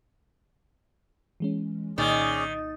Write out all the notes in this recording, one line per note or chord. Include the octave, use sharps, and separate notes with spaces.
E3 G#3 C#4
C2 A#2 D#3 C#4 G#4 D5 A6